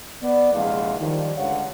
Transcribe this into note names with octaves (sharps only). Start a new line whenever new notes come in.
B3 D5
A#1 E2 C3 G#3 F5
D#3 F3 G3
C#2 D3 G3 C#5 F5 F#5